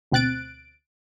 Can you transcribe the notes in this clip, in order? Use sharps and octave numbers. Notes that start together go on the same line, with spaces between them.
D2 B2 C4 F#6 A6 D7